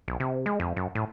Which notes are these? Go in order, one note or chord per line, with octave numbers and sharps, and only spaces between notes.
B1
C3
G#3
F2
F#2
A2